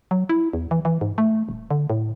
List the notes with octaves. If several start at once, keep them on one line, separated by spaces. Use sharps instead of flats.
F#3
E4
E2
E3
E3
G#2
A3
D#1
D3
A2